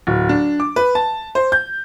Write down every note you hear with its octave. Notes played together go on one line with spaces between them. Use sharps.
D1
D4
D6
B4
A5
C5
G6